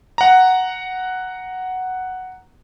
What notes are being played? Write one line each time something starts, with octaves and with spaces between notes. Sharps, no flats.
F#5 A#5